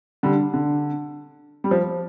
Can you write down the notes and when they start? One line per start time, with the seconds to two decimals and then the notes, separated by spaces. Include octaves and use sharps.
0.23 D3 G3
0.54 D3
1.64 G3
1.71 F3